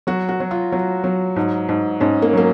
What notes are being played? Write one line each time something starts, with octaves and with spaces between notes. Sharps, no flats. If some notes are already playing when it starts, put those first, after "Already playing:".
F#3 F#4
F#4
F#3
F4
F#3
F#3
G#2
G#2
G#2 C#4
A#3
F#3 A#3